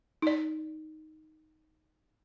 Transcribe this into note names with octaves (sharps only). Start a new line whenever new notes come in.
D#4 D5